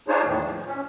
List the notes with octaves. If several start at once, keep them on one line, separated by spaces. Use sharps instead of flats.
D4 D#4 F4 G#4 C5 C#5
E2 A2 D#3 E3
F3
C#4